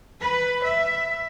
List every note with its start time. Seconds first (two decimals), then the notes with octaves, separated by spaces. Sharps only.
0.21 B4
0.63 E5